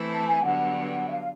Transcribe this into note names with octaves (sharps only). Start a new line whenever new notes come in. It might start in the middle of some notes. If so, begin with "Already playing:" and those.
Already playing: E3 A3 C4 E4
A5
G#5
G2 D3 F#3 B3 F#5
E5
F5